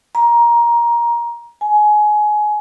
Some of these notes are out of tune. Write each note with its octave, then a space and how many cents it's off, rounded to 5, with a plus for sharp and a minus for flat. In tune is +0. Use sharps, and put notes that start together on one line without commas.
A#5 +15
G#5 +20